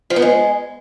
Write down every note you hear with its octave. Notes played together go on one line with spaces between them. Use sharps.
F3
B3
G#3